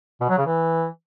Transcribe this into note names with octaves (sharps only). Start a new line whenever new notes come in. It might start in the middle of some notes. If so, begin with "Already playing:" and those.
B2
F#3
C#3
E3